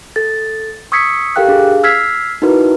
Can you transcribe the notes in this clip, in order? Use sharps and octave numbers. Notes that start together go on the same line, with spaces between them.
A4 A6
C#6 D#6 E6 G#6 B6 C#7
G4 A4 A#4 F5 G5 F#6
D4 G#4 F5
E6 F6 G#6 B6 C7
D#4 E4 F#4 A#4 B4